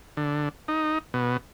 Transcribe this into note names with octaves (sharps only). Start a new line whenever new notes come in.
D3
D#4
B2